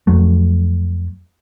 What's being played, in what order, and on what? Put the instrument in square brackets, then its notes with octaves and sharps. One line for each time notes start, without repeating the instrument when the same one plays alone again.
[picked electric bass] F2 F#3 A3